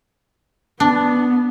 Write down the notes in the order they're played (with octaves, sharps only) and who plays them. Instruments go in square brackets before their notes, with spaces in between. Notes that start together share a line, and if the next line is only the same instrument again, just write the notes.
[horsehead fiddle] B3 [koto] D4